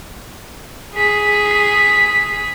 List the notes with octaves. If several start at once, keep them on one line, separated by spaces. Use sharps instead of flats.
G#4 B6